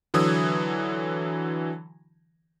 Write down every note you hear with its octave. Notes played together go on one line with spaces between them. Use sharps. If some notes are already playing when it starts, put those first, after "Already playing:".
D3 E3 F#3 D#6 E6 G#6